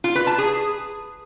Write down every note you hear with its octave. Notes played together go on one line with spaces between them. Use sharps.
F4
B4
A5
G#4